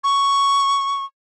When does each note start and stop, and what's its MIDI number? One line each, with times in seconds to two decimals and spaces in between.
0.04 1.05 85